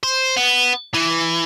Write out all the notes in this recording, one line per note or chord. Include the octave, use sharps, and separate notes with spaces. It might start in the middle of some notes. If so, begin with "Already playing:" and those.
C5
B3
E3